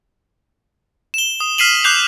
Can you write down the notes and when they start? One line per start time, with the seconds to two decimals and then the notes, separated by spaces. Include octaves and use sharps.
1.14 E7 G7
1.40 D#6
1.58 F6 B6 C7 D#7 E7 F#7
1.84 D6 F#6 G6 C7 F7